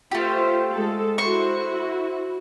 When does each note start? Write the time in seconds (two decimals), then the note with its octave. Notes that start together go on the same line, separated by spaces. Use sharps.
0.11 A3 F4 G4 C5
0.71 G#3 A4
1.18 E4 F#4 C5 C#6